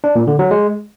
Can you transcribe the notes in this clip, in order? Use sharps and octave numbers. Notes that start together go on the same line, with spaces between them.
D4
A#2
D3
F#3
G#3